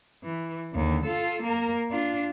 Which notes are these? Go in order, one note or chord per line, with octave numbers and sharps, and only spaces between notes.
E3
D#2 D3
F4 A4
A#3 A#4
D4 F4